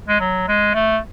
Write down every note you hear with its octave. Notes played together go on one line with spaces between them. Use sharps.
G#3
F#3
G#3
A3